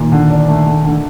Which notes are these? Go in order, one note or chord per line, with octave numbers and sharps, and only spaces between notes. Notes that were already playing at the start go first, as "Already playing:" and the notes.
Already playing: A#2 D#3
D3
D4
A3
D3
D3